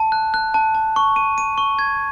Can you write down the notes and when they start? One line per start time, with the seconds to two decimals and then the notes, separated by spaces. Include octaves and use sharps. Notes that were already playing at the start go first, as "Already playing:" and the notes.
Already playing: A5
0.12 F#6
0.34 F#6
0.54 A5
0.75 A5
0.96 C#6
1.16 D#7
1.38 D#7
1.58 C#6
1.79 G#6